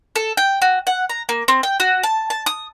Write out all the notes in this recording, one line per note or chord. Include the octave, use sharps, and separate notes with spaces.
A4
G5
F#4
F#5
A#5
A#3
C4
G5
F#4
A5
A5
D#6